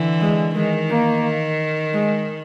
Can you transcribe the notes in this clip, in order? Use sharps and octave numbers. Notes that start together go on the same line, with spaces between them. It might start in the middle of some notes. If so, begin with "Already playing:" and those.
Already playing: D3 E3
G#3
D#3 G#3
A#3
G#3